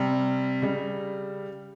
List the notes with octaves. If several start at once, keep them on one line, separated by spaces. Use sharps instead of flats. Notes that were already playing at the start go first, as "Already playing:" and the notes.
Already playing: C3 G3
C#3 G3